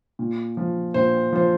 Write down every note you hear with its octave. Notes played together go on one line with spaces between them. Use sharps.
A#2
F3
A#2 C5
F3 C5